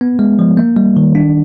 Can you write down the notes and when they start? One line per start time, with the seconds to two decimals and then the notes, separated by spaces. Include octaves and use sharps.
0.01 B3
0.19 G#3
0.39 F3
0.57 A#3
0.76 G3
0.97 D#3
1.15 D4